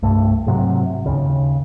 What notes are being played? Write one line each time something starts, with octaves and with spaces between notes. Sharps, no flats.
C2 G2 A3
G#2 C3 F#3
D#2 C#3